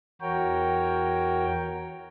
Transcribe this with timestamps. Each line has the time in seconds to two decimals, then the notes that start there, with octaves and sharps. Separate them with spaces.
0.21 E2 F#4 A#4 C#5 G5